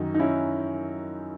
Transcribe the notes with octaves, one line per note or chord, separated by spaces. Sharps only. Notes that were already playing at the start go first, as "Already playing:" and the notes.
Already playing: F#2 D#3 D#4 F#4
D#4
C#4 E4